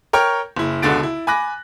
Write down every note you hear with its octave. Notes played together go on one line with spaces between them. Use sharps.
A#4 C#5 G5 C#6 F6
F#1 E4
C#2 B2 D3 F#4 A6 D7
E4
G#5 B5 D6 F#6 A#6